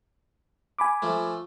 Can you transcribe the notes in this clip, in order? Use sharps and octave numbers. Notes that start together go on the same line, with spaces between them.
G#5 B5 D6
F3 A3